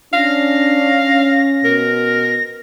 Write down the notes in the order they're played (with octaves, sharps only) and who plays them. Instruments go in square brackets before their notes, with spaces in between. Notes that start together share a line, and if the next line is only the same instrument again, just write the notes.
[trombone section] C#4 [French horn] D4 [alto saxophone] F5 [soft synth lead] A#6
[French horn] B2 [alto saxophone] A#4